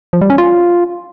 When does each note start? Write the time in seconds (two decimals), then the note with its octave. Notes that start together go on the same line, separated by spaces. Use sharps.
0.13 F3
0.21 G3
0.30 C#4
0.38 F4